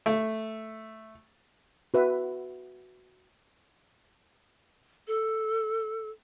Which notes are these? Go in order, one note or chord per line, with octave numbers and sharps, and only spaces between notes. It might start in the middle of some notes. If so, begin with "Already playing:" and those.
A3
F#4 B4 E5
A4